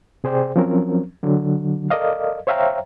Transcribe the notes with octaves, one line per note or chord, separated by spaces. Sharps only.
C3 G#4 C5 D5 G5
F3 F#3 C4 C#4 A#4
D3 F#3
A4 A#4 D5 D#5 F5
C5 C#5 E5 F5 G5 A#5